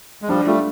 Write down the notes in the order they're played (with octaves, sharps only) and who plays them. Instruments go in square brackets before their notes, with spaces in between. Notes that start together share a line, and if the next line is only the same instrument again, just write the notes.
[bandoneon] G#3
[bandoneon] F3 G3 [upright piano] D4
[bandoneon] G3 A3 [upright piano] F4